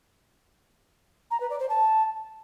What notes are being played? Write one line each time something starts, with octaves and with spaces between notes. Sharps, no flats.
A#5
B4
D5
C5
A5